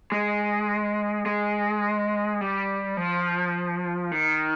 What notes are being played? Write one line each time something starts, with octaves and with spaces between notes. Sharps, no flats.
G#3
G#3
G3
F3
D#3